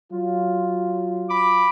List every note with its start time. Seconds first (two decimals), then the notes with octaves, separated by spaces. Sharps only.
0.13 F#3 F4
1.30 B5 D6